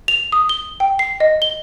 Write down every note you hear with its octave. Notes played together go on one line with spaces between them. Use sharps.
F7
D#6
G7
G5
C7
D#5
G7